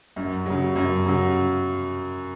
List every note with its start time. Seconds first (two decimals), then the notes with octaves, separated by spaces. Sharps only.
0.16 F#2
0.46 C#3 F#3
0.76 F#2
1.06 C#3 F#3